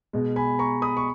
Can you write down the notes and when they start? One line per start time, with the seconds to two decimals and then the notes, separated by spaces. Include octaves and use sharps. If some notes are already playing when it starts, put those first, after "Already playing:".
0.13 B2 G#3
0.36 G#5 B5
0.59 A#5 C#6
0.82 B5 D#6
0.97 C#6